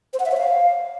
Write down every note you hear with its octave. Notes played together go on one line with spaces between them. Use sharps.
C5
F#5
E5
C#5
F5